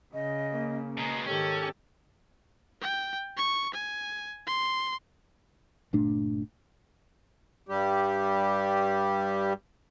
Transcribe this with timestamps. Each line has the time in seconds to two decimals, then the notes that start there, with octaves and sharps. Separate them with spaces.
0.14 C#3 D#5
0.51 A#3
0.97 B2 G#3 A#5
1.27 G#2 D#3 C#4 G4 A4
2.81 G5
3.37 C#6
3.74 G#5
4.47 C6
5.93 G1 A#2 A3 D4
7.69 G2 G3 G4